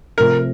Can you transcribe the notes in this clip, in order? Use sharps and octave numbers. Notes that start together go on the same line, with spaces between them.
C3 F3 A3 C4 A#4